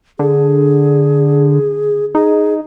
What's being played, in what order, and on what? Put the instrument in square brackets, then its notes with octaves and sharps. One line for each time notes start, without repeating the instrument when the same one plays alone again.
[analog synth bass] D3 [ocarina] G#4
[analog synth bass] D#4 [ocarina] G#4